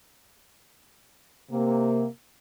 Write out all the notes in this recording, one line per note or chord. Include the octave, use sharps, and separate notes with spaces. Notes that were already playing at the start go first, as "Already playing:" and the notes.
C3 A#3